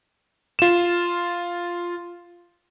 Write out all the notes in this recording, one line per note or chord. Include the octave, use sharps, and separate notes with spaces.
F4 E7